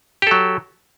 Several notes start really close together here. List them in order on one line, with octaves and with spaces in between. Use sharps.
G4 A4 F#3